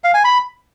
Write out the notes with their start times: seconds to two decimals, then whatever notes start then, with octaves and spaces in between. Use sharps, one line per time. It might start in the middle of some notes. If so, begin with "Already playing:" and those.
0.04 F5
0.14 G#5
0.24 B5